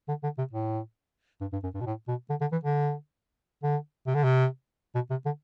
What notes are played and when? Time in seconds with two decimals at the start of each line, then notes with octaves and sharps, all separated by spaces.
0.09 D3
0.23 D3
0.38 C3
0.53 A2
1.41 G2
1.53 G2
1.64 F#2
1.75 G2
1.81 B2
1.86 A2
2.08 B2
2.30 D3
2.41 D3
2.52 E3
2.64 D3
3.63 D3
4.07 C3
4.15 D3
4.24 C3
4.95 B2
5.11 C3
5.26 D3